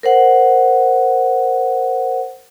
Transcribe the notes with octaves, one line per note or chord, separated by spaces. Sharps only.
A#4 C5 F#5